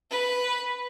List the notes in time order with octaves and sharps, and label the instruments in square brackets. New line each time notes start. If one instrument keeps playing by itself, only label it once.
[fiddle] B4